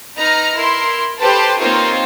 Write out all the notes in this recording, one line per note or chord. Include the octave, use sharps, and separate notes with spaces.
D#4 B4 A#5 F6
E4 A#4 C6
G4 A4 B4 C5 A5
A#3 C4 D#4 F4 C5 C#5